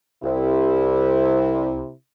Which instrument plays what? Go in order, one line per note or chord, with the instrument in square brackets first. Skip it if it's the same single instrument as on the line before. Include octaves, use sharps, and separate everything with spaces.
[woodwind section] C2 [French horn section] C3 E4